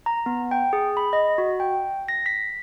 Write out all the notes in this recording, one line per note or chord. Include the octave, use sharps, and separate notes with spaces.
A#5
B3
G5
G#4
B5
D#5
F#4
G5
A#6
B6